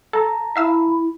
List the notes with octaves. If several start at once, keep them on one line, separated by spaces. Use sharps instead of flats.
A4 A5 A#5
E4 E5 F5 E6